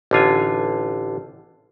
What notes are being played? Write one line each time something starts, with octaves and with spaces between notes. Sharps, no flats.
A1 D3 F4 G#5